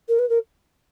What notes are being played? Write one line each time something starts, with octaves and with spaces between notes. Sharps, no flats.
A#4
B4
A#4